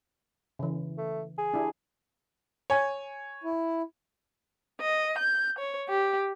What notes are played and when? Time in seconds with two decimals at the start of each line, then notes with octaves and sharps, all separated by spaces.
0.59 C#3 E3
0.98 A3
1.38 G#4
1.54 D4 E4 G4
2.70 C#5 G#5
3.44 E4
4.80 D#5
5.18 G6
5.58 C#5
5.88 G4